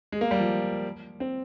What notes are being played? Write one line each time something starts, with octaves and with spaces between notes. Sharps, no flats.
G#3
A#3
G3
F3
C4